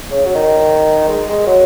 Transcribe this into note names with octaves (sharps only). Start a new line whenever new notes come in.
C#3
F#3
D#3
G#3
G#3
F#3